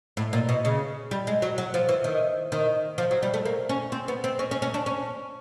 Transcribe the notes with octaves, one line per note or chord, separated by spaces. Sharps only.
A2
A#2
B2
C#3
G3
G#3
F#3
F#3
F3
E3
D#3
D#3
F3
F#3
G3
A3
A#3
C#4
C4
B3
C4
C#4
C#4
C#4
D4
C#4